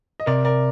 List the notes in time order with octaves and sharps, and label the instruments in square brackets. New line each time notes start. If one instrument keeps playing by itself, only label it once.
[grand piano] D#5
[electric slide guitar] C3 [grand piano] A#4 D5
[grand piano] A#4 D5